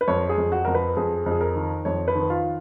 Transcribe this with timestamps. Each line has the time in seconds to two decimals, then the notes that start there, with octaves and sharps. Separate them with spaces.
0.01 B4
0.08 F2 C#5
0.29 G#4
0.38 F2
0.52 F#4
0.65 F2 A#4
0.75 B4
0.96 F2 G#4
1.26 F2
1.31 G#4
1.41 A#4
1.56 D#3
1.85 F2 C#5
2.08 B4
2.15 D#3
2.30 F4